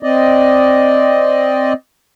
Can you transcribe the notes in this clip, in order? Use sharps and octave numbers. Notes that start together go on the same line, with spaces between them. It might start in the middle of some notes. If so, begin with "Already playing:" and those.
C4 D5 D#5